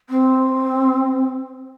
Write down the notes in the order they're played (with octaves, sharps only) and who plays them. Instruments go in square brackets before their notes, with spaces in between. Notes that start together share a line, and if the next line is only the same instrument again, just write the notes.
[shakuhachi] C4